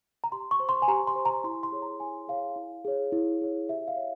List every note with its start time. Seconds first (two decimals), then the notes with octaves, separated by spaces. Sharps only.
0.24 A#5
0.32 G4 C6
0.51 C#6
0.60 C5
0.69 C6
0.82 G#5
0.88 G4 A#5
1.07 C6
1.16 C5
1.25 A#5
1.44 E4 C6
1.63 C6
1.72 G#4 C#5
1.82 A#5
2.00 E4 G#5
2.28 G#4 C#5 F5
2.56 E4
2.85 G#4 C#5
3.12 E4
3.41 G#4 C#5
3.69 G4 E5
3.88 F5
3.96 C#5